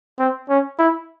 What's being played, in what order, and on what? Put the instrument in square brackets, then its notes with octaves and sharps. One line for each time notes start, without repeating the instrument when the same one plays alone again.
[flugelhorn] C4
C#4
E4